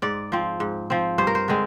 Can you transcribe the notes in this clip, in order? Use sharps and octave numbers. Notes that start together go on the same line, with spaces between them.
G#2 D5
F3 C4
G#2
F3 C4
G2 C5
A#4
C5
D3 G#3 C4